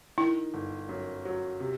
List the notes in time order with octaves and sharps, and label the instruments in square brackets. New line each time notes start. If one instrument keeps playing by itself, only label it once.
[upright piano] D#3 [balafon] E4
[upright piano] G1
F#2
F#3
C3